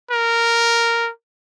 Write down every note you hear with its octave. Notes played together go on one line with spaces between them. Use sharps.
A#4